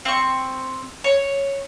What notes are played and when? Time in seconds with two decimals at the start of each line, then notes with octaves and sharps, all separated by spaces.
0.05 C4 C#6
1.04 C#5